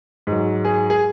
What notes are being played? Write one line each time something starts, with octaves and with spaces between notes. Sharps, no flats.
G#2 F#3
G#4
G#4